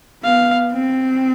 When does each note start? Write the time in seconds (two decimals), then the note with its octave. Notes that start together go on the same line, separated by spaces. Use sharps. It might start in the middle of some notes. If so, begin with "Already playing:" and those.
0.24 B3 F5
0.73 C4